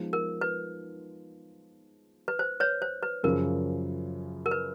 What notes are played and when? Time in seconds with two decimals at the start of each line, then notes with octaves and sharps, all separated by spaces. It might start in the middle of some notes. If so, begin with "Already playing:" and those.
Already playing: F3 G#3 B3 D#4
0.13 A#4
0.41 B4
2.28 B4
2.39 C5
2.60 B4 C#5
2.82 C5
3.03 B4
3.23 F#2 C#3 F3 A#4
4.46 A#4
4.51 B4